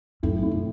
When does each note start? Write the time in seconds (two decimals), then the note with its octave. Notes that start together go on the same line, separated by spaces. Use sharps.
0.23 F#2 A2
0.42 A2
0.51 B2